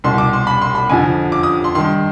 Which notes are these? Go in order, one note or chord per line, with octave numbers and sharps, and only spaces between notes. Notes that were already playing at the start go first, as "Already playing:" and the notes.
C2 B2 C6
D6
C6
B5
C6
B5
F2 D3 F3 G#5
D6
D#6
C6
G2 D#3 C6